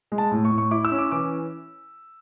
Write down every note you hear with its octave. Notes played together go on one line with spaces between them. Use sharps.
G#3
A5
A2
C#6
A2
C#6
E4 D6
E6
C#4
D6
E3 D6